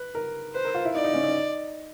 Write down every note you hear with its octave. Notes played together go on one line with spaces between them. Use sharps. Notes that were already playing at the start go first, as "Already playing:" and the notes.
Already playing: B4
A#4
B4 C5
A#4
F4
E4
D#4 D5
D#4
C#4
D#4